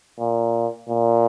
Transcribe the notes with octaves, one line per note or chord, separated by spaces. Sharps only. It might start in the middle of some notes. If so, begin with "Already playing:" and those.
A#2
A#2